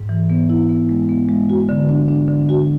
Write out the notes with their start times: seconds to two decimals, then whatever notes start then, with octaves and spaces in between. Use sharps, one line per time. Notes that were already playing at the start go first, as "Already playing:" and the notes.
Already playing: G#2
0.09 E3
0.30 B3
0.50 E4
0.69 B3
0.89 G#3
1.09 B3
1.29 G#3
1.50 F#4
1.69 D3
1.89 D4
2.08 D4
2.28 D3
2.49 F#4